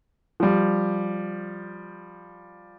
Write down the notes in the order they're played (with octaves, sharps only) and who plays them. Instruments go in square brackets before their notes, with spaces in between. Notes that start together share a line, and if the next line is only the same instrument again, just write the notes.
[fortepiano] F3 G3